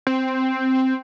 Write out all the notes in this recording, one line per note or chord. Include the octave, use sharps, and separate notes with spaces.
C4